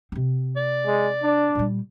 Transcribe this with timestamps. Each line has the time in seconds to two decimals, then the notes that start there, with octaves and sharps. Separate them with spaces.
0.12 C3 C4
0.56 D5
0.86 G#3
1.23 D4
1.55 A#2 G3